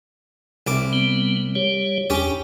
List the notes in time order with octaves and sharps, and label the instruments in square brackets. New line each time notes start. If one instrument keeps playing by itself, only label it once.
[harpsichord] C2 E4 D6
[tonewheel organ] G3 B3 C4
G3 G4 C#5
[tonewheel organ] E2 D4 [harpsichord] C#4 G4 C#5